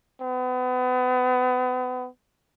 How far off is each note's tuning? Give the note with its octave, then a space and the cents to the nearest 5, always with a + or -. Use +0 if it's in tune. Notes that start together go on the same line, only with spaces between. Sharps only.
B3 +35